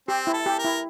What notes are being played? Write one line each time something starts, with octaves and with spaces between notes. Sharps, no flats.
C4 G4
E4
A4
G4
A#4
E4